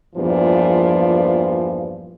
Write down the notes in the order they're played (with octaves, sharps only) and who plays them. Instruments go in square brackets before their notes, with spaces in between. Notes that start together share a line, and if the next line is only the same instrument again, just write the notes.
[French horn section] E2 G2 A#2 F3